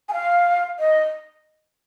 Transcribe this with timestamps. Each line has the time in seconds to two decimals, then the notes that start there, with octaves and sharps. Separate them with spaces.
0.09 G#5
0.13 F5
0.79 D#5